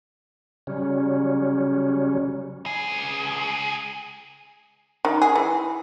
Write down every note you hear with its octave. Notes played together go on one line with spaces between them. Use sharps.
C#3 F#3 G3 C#4
C#2 G#4
D#3
G#4
E3